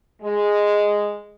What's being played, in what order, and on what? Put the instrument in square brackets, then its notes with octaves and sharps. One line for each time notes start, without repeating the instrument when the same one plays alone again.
[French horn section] G#3